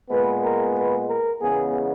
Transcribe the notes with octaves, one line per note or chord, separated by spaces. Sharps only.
A#2 G#3 B3 B4
A#4
B4
A#4
E2 C#3 G#3 B3 G#4